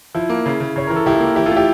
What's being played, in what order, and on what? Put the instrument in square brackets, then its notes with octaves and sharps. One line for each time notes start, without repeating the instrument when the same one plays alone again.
[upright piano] F3 [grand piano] E4
[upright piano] A#3
C#3
C#3
[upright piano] C#3 [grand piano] C#5
[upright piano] E3 [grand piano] A#4
[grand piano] A4
[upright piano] C#2 [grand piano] E4 G4
[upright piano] A#3
[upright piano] E3 [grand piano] E4 G4
[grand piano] F4 A4
[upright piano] A3
[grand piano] E4 G4